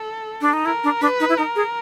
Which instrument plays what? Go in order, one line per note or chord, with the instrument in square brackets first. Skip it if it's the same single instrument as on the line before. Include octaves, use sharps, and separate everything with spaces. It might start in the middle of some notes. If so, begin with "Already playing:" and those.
Already playing: [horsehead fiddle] A4
[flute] D4
D#4
[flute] E4 [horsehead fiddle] A#4
[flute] D4
[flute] D4 [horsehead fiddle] B4
[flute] D#4
E4
[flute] D#4 [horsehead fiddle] A#4
[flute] G#4